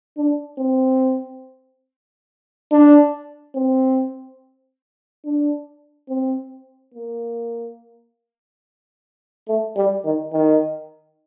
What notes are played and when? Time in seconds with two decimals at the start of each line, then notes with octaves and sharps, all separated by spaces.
0.17 D4
0.59 C4
2.71 D4
3.56 C4
5.25 D4
6.09 C4
6.95 A#3
9.48 A3
9.77 G3
10.05 D#3
10.33 D#3